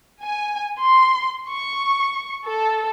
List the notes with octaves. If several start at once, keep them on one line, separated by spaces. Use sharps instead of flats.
G#5
C6
C#6
A4